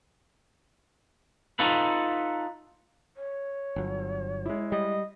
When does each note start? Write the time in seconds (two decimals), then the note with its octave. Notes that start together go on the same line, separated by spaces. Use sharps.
1.59 D#4 F4 A4 B4
3.15 C#5
3.76 G1 F#3
4.46 G#3 E4
4.72 G3 D#5